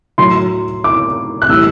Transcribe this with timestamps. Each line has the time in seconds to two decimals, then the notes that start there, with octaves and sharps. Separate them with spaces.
0.18 A2 F#3 C6
0.84 D6
1.42 F#6
1.49 A2 E3 G3 E6